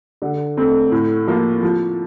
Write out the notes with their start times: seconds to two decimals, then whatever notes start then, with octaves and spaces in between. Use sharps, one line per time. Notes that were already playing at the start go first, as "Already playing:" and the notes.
0.22 D3
0.57 A3 C4
0.91 A2
1.27 F3 A#3 F4
1.62 F3